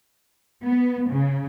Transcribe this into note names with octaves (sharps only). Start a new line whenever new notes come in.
B3
C#3